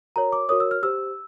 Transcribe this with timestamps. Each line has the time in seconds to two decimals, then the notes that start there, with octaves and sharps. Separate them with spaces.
0.16 F#4 A#4 C#5 A#5
0.32 D6
0.49 F#4 A#4 C#5 D#6
0.60 E6
0.71 F6
0.83 G4 C5 E6